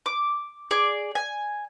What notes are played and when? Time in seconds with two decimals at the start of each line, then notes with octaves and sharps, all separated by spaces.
0.06 D6
0.71 G#4 D5
1.15 G#5